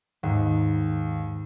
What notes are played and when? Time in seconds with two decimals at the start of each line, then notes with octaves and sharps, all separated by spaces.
0.23 D#2 G#2